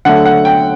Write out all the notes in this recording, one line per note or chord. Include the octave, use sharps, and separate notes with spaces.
D3 F#3 A3 F#5
F#5
G5